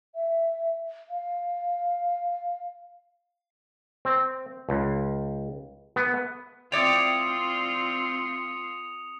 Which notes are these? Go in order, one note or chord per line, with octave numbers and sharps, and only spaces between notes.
E5
F5
C4
C#2
B3
C4 E4 F4 D5 G5 D#6 C#7 F7